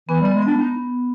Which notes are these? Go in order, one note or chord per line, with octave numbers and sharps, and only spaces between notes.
E3 B3
G3
B3
G#3
B3 D4
B3 D#4